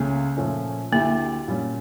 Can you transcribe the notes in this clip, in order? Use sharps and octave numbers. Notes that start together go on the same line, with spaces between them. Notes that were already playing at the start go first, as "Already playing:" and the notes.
Already playing: C#2 C#3 A3 A#3
A#2 F3 A3 C#4
D2 D3 A3 A#3 E4 G4
A#2 G3 C#4